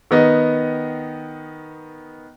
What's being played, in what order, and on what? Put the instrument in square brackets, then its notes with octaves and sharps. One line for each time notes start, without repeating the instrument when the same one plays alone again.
[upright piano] D#3 B3 D#5